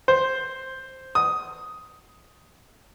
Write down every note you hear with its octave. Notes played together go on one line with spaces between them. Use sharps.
C5
D#6